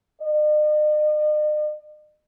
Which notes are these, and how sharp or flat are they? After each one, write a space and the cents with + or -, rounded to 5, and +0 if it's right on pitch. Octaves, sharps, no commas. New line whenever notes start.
D#5 -45